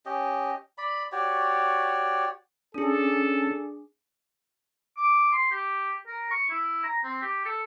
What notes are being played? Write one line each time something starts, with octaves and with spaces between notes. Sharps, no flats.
C#4 G4 D#5
D5 B5
F#4 G4 C#5 D5
C#4 D4 G#4 A4
D6
C6
G4
A#4
C#6
E4
A#5
C4
G4
A4